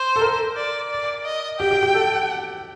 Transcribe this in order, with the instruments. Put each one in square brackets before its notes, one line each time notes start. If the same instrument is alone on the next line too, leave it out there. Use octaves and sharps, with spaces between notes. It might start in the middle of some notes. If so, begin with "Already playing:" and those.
Already playing: [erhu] C5
[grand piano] A4
A#4
[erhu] D5
D5
D#5
[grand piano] G4 [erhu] G5
[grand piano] G4
G4
A4